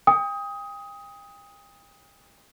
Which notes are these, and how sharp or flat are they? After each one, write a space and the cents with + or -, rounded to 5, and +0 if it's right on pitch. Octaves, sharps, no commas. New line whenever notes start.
G5 +40 D#6 +15